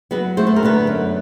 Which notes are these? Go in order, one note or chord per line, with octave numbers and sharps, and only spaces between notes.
F#3 B3 B4
A3 C5
B4
A#4
D3 B3 B4
F#2